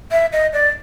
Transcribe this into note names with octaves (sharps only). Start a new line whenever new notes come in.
E5
D#5
D5